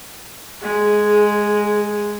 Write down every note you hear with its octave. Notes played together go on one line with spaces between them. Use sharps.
G#3 G#4